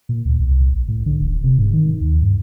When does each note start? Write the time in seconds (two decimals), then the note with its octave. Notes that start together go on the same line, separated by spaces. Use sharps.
0.09 A#2
0.25 D2
0.40 C2
0.74 A#1
0.88 A2
1.06 D3
1.21 D#1
1.44 C3
1.59 G#2
1.73 D#3
2.01 D#2
2.22 G2